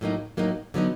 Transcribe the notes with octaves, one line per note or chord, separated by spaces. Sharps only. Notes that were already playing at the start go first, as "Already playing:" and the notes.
A2 F#3 A#3 D#4
A2 F#3 A#3 D#4
D3 F#3 B3 D#4